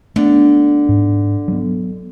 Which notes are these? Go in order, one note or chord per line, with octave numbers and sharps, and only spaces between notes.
D3 A3 B3
G#2
F#3 B3